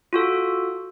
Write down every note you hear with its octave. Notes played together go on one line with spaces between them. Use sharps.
F4 F#4 A4